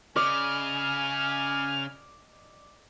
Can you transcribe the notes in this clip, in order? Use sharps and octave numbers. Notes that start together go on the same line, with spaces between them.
C#3 D5 D#5 G#5 F6